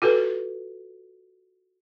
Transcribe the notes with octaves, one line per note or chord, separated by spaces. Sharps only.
F4 F#4 A4 B4